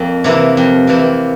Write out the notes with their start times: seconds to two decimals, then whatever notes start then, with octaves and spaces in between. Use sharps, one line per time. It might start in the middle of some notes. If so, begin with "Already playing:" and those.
Already playing: F2 A#3
0.24 C3 E3 A#3 E4
0.57 F2
0.87 C3 E3 A#3 E4